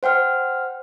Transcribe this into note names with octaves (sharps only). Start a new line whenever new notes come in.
C5 F#5 G5 F6